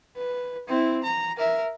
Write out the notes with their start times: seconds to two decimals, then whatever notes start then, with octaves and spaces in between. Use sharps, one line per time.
0.17 B4
0.68 C4 E4
1.03 A#5
1.38 A#4 E5